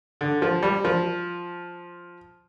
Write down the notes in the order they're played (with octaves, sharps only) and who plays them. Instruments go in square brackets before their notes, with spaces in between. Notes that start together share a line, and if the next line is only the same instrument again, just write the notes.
[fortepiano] D3
F3
G3
F3